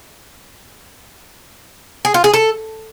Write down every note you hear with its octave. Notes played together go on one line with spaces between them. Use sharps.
G#4
F4
G#4
A4